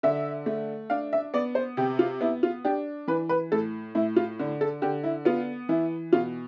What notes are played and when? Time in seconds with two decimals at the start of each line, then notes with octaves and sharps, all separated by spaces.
0.03 D3 E5
0.46 A3
0.90 D4 F5
1.13 E5
1.34 B3 D5
1.55 C5
1.77 C3 G4
1.99 F4
2.21 B3 E4
2.43 F4
2.65 D4 G4
3.08 E3 B4
3.29 B4
3.52 A2 A4
3.95 A2 E4
4.16 F4
4.39 D3
4.61 A4
4.82 D3 G4
5.04 E4
5.25 B3 F4
5.69 E3 E4
6.13 B2 F4